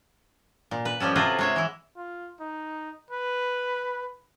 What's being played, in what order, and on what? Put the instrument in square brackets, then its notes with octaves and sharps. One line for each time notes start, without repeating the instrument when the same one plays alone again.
[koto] A#2
B4
F3 G3 C#4 A4
C3 F4 F#4 G#4 A4 B4
G#3 C#5 E5
E3 E4
[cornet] F4
D#4
B4